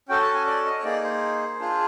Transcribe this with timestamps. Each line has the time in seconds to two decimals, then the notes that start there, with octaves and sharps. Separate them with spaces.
0.09 C#4 F#4 A4 G5
0.22 A5
0.34 G#5
0.47 D5
0.65 D#5
0.78 C#5
0.84 A#3 D#4 G#4 D5
1.04 C5
1.59 D4 F4 G#4